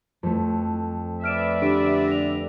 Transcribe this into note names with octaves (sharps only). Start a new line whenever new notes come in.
F2 A3
B4 D5 E5 F6 D7 E7
D3 G4 D7
A#6 F7